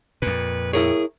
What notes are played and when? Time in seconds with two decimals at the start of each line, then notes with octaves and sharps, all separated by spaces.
0.22 F2 A#2 B4
0.73 E4 G#4 A#4 C#5